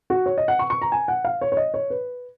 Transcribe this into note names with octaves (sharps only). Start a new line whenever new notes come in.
F#4
C#5
D#5
F#5
C#6
C#6
A#5
G#5
F#5
F5
C#5
C#5
D#5
C#5
B4